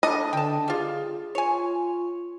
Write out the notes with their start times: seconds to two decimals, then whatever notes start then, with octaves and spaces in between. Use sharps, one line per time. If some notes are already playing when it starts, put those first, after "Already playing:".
0.03 D4 A4 D#5
0.33 D3 G5 A5
0.68 G3 F4 G#4
1.35 F4 C#5 G#5